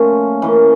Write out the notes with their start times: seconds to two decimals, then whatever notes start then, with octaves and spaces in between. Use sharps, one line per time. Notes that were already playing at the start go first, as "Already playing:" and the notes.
Already playing: A#2 F3 A3 C#4
0.42 E3 A#3 C#4